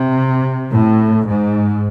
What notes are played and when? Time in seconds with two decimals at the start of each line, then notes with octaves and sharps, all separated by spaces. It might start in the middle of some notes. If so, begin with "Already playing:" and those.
Already playing: C3
0.71 A2
1.26 G#2